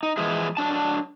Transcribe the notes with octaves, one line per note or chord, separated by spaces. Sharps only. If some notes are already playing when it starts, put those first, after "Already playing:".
D#4
E3 F3 G#3 E4 G#4
F#3 D4 A5